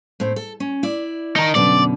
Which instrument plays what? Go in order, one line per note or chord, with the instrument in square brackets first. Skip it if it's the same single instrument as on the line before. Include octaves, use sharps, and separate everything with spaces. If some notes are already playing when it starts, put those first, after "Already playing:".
[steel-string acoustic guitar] A2 C4
A4
C#4
E4 D5
[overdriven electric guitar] D#4 A#4 [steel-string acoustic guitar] A5
[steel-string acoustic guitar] F#2 B2 D3 [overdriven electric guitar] D5